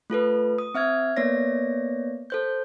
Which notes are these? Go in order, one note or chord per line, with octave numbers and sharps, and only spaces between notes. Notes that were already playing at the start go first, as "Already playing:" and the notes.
A3 F4 A4 B4
D#6
C4 E5 F6 G#6
A#3 B3 C#5 D5 A#6
A4 C5 G6